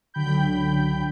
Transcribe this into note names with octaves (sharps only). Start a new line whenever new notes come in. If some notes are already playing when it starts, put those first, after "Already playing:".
C#2 D3 F#3 G5 B5 G6